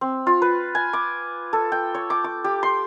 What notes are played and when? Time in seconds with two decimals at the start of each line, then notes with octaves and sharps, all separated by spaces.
0.01 C4
0.27 F4
0.42 B4
0.75 G#5
0.93 D6
1.53 A4
1.72 G5
1.94 C#5
2.10 D6
2.24 D6
2.44 G4
2.63 C6